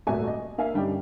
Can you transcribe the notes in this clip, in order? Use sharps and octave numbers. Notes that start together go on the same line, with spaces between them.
D#1 G#1 A3 F#4 E5 G#5
D#5
A#3 E5 F5 G#5
G2 D3 G3 C#4 D#4 G4